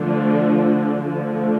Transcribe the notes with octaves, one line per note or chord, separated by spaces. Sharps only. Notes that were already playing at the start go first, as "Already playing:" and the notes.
Already playing: D3 F3 A3 D4
D3 F3 A3 D4